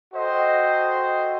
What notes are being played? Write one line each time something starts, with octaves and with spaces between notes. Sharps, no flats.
F#4 A4 C5 D#5 G5